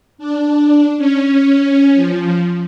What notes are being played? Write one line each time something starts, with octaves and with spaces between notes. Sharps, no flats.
D4
C#4
F3